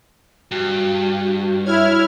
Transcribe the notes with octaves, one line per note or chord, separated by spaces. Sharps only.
G2 F#4
E4 C#5 F6 G#6